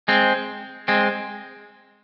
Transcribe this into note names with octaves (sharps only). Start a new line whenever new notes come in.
G#3 C4
G#3 C4